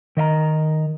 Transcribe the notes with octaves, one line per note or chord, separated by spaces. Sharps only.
D#3 D#5 E5 A#5